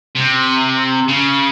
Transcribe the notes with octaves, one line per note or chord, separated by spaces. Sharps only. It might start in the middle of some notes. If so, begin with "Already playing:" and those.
C3
C#3